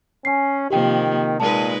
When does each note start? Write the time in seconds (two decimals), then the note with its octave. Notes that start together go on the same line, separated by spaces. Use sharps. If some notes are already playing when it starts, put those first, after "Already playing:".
0.25 C#4 G#5 C7
0.70 C3 D#3 F3 A#3 G4 G5
1.40 A#2 G#3 D#4 B4 A5